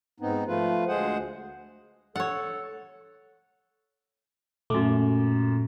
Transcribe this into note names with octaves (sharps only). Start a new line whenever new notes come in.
G#2 B3 C4 D#4
F3 A3 F4 B4
D2 G#3 G#4 C5 F#5
A4 C#5 F#5
F#2 A#2 A3 D6